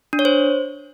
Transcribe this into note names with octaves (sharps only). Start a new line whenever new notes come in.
D4
C#5
C5